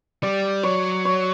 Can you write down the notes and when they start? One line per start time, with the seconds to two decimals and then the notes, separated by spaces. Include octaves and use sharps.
0.23 G3 D5
0.63 F#3 C#5
1.05 C#5